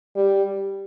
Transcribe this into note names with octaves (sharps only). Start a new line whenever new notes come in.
G3